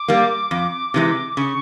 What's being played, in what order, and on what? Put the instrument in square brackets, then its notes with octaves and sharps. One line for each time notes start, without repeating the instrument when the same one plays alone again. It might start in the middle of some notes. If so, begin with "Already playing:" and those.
Already playing: [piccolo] D6
[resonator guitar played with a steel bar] G3 A#3
F2
C3 E3 G#3
[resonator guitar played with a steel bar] C#3 [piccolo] C#6